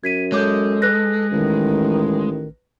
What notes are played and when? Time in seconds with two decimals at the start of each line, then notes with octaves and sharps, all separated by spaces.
0.04 F#2 G#6 B6 D#7
0.32 G#3 A4 C#5 D6 G6
0.82 B4 F#6 A#6
1.32 A1 D#3